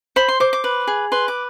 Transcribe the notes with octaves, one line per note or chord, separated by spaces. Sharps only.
C5 B5
C6
C5 D6
D6
B4
G#4
B4 C6
D6